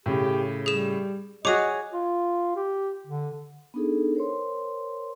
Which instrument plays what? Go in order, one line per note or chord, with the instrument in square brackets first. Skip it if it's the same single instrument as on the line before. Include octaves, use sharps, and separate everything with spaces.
[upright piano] A2 C#3 [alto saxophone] G4
[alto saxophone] G3 [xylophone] G#4 E7
[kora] F#4 G#4 C#5 [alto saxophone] D#5 [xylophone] D6 D#6 [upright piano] F7
[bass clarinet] F4
G4
D3
[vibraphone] B3 D4 D#4 G#4 A4
A#4 C5 C#5 C6